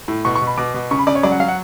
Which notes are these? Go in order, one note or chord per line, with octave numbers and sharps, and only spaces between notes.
A2
B2 C#6
C#6
B2
B5
B2 D6
B2
C#3 C#6
B5
C#3 D5
C#5
F#3 D5
F#5
F#3 F5
F#5